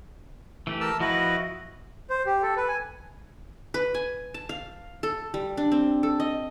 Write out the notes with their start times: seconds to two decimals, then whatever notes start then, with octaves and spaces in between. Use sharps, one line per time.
0.67 E3 A3 G4
0.81 A#4 A5 E6
1.00 F3 E4 F#4 B4 D#5
2.10 C5
2.26 G4
2.42 A4
2.57 B4
2.68 G#5
3.74 B4
3.95 G#5
4.34 A5
4.49 F5
5.03 A4
5.34 G3
5.57 D4
5.72 C4
6.03 A4
6.20 D#5